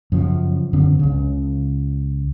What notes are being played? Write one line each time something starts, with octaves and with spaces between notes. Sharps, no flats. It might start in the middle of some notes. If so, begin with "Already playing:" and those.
F#2 C#3 F3
F#2 D3 C4 D4
C#2 C#3